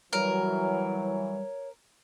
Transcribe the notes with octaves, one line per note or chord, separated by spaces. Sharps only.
E3 F#3 G3 A#4 C#5